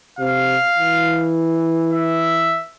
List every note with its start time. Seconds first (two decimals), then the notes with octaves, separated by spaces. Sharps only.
0.19 C3 F5
0.78 E3
1.93 E5